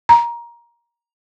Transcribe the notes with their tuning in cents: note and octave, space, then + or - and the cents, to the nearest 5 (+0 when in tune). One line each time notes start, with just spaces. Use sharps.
A#5 +20